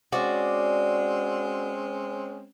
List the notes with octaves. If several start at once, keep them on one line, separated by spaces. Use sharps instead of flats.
G#3 C4 C#4 F#4 D5